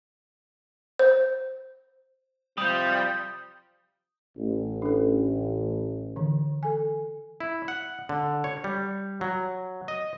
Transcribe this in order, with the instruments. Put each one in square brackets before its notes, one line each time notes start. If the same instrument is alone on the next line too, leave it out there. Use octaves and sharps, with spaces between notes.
[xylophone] C5
[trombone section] C3 F3 [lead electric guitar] G3 [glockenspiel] D#6 G6
[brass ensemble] A1
[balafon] D4 A4
D3 E3
A4 G#5
[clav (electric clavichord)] E4
F#5
D3
C#5
G3
F#3
D#5